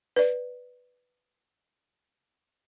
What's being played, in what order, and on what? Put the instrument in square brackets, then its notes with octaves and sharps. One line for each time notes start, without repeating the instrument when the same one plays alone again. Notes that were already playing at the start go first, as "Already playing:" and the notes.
[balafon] B4 D5